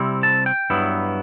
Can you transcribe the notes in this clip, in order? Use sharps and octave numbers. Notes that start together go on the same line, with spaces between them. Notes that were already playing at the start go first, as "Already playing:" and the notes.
Already playing: C3 G3 C4 E4
A5
G5
G2 F#3 B3 E4